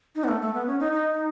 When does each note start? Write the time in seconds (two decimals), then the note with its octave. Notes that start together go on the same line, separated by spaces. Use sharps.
0.15 D#4
0.24 B3
0.28 A3
0.42 A3
0.54 B3
0.67 C#4
0.80 D#4
0.92 D#4